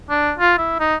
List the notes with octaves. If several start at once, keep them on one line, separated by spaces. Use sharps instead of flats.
D4
F4
E4
D#4